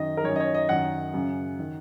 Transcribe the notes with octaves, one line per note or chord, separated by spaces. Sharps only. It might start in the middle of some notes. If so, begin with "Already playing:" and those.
Already playing: F#2 D#3 D#5
A#4
F#2 D#3 C#5
D#5
C#5
D#5
F#2 D#3 F#5
F#2 C#3
D#3